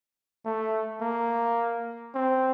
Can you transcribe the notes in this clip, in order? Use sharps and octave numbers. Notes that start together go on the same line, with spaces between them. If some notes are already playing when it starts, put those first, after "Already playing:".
A3
A#3
C4